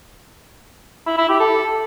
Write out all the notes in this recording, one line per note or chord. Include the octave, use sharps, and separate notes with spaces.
E4
E4
G4
A4